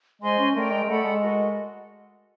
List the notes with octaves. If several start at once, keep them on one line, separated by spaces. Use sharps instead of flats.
G#3 C5 D#5 G#5 C6
C#4
A3 A#4 D5 G5 A#5
G#3
G#3
A3 A4 D5 F#5 B5
G#3
F#4 A#4 D#5